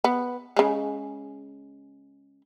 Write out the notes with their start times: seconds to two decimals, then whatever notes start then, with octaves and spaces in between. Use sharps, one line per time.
0.04 B3
0.56 C#3 G#3